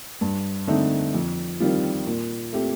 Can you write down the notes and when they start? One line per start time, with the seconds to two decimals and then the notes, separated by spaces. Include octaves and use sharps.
0.21 G2
0.67 D3 A3 C4 D#4
1.14 F2
1.60 D#3 G3 C4 F4
2.07 A#2
2.53 A3 C4 G4